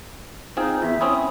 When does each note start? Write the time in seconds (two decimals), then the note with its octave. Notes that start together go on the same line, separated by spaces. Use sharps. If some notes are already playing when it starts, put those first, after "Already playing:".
0.57 C4 D#4 F4 G#4
0.82 E2 E5
1.01 C4 C#4 E4 D#6